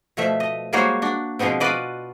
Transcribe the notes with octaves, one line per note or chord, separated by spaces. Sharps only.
B2 F3 A3 E5
D#5
G3 G#3 A#3 F#4 C5 C#5
D4 F#4
B2 F3 G#3 B3 C4
F4 F#4 B4 D5 D#5